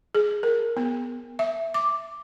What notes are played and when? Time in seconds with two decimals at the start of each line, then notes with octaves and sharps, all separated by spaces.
0.15 G#4
0.43 A#4
0.77 B3
1.39 E5
1.74 D6